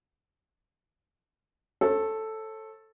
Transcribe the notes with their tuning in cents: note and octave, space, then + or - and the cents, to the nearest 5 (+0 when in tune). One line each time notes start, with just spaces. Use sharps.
A4 +0 C#5 -40